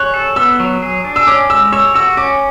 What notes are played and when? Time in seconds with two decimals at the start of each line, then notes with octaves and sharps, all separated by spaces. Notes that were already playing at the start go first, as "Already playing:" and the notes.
Already playing: C#5 F#6
0.14 A4
0.36 B3 E6
0.60 F#3
0.82 G#4
1.05 D4
1.16 E6
1.27 C#4 D6
1.50 G#3 E6
1.73 C#5 E6
1.94 F#4 E6
2.17 C#4 D6